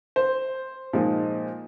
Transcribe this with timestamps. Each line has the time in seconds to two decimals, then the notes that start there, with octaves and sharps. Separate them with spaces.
0.16 C5
0.93 A#2 F3 G#3 D#4